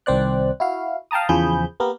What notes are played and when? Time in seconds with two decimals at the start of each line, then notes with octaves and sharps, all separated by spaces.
0.06 C2 D#3 C4 C5 D5 F#6
0.60 E4 F#4 F5
1.11 F5 G5 A5 A#5 D#6
1.29 E2 C#3 F3 G#4 B5 G6
1.80 A#3 B3 G4 A#4